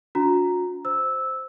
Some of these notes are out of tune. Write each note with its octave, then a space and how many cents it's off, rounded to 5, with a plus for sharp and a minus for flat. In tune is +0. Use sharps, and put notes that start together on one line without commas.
D4 -40 F#4 -40 A#5 +0
C5 +0 E6 -10